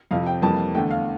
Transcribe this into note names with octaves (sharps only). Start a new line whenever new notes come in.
F2 C3 F3 F5
G5
F2 E3 G3 A#3 A5
E2 D3 A3 G5
F5